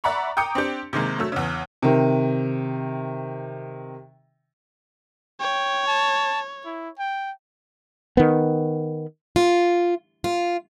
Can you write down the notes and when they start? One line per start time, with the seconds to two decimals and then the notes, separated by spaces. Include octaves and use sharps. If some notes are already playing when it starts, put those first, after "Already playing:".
0.04 D5 E5 F#5 A#5 B5 C#6
0.37 G5 A#5 D6 D#6 G6 C#7
0.55 C4 D4 G4
0.93 C3 D#3 G#3 A#3
1.19 F#3 A3 E6
1.32 E2 C#3
1.82 C3 D#3
5.41 C#5 G5
5.88 A5
6.65 E4
6.99 G5
8.17 D#3 B3
9.36 F4
10.24 F4